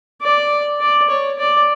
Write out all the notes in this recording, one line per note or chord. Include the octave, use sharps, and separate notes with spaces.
D5
D5
C#5
D5